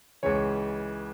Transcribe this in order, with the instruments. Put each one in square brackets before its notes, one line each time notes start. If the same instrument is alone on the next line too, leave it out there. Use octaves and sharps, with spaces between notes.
[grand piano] C#2 C#3 E3 C#5